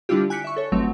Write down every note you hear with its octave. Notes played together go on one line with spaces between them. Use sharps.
D3 G3 D4 E4 F4 G4
G#5 F#6 G6 B6 C#7 D7
E5 C#6
A4 C#5
G1 F#3 A3 C4